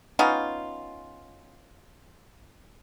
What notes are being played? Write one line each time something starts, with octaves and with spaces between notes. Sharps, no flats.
B3 C#4 D#4 F4